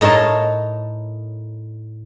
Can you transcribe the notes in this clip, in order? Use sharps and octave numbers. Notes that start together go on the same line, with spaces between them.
A2 D#4 A#4 C#5 A5